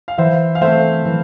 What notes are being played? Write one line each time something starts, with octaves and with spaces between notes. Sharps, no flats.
F5
E3 C5 E5
F5
A3 C4 C5 E5
E3